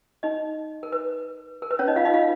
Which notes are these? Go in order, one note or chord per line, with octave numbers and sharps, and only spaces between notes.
D#4 D#5
A#4
B4
A#4
B4
C#4 C#5
D#4 D#5
F4 F5
D#4 D#5
F4 F5